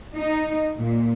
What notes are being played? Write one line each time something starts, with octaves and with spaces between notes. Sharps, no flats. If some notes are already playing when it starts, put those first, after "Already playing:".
D#4
A#2